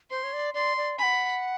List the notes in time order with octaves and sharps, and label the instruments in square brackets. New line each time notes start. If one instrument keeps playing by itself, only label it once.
[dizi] C5 [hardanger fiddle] C6
[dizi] C#5
D5
[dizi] D5 [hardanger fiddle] C6
[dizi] D5
[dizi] G#5 [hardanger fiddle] B5
[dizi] F#5